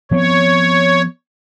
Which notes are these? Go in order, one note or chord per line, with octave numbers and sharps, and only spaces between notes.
F3 B3 C4 C#5